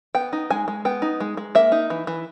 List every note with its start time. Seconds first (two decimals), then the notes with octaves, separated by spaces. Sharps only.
0.15 B3 G5
0.33 D#4
0.50 G#3 G#5
0.68 G#3
0.85 B3 G5
1.02 D#4
1.20 G#3
1.37 G#3
1.55 A#3 E5
1.72 D#4
1.90 E3
2.07 E3